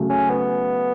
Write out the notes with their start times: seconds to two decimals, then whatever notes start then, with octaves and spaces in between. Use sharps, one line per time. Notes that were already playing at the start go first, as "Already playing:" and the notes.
Already playing: C#3 F#3 A3
0.10 C#4
0.30 B3